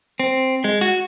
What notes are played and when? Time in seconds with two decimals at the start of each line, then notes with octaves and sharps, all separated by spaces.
0.20 C4
0.64 G#3
0.81 F#4